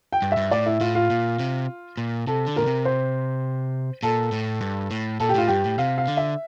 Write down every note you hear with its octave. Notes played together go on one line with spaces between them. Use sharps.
G5
G2
E5
G2
A2 D5
E4
A2 F4
F4
A#2
C3
A#2
C3 A4
D3
A#2 A#4
C3
C5
A#2 A4
A2
G2
A2
A#2 A4
G4
A2 F4
G2 G4
A2
C3 F5
F5
D3
E5